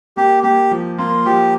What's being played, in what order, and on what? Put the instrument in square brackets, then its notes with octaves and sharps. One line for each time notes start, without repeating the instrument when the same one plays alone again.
[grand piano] A#3 [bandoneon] G4
[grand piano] A#3 [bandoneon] G4
[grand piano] F3
[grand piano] A#3 [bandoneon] F4
[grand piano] F3 [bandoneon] G4